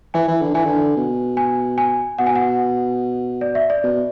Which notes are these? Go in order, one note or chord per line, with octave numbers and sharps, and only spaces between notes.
E3 G#5
E3
D3
E3 G#5
D3
B2
G#5
G#5
B2 F#5
G#5
F#5
D5
E5
D5
B2